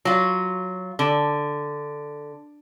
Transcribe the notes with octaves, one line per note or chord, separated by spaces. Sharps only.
F#3 F4
D3